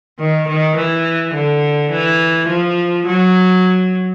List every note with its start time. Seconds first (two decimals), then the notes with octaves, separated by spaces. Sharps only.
0.19 D#3
0.48 D#3
0.76 E3
1.34 D3
1.91 E3
2.48 F3
3.06 F#3